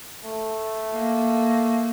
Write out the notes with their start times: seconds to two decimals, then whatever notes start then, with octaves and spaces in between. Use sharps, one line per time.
0.24 A3
0.93 A#3